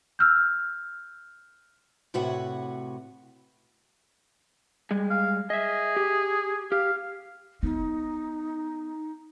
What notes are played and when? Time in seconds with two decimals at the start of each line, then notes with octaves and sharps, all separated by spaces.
0.19 E6 F6 G6
2.14 A2 C3 F#4 B4 C#5 F#5
4.91 G3 G#3
5.10 F5
5.50 G#4 D#5 E5
5.96 G4
6.72 G4 F5
7.63 B3 D#4